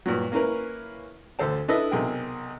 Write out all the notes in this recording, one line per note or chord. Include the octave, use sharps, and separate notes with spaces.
G2 A#2 F#3
A#3 C#4 E4 A#4 B4
D2 A4 C5 A5
D4 E4 A4 B4 D#5 E5
B1 C3 G#4 A#4 G5